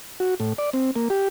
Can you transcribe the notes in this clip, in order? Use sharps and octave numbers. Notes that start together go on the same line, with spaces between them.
F#4
A2
D5
C4
A#3
G4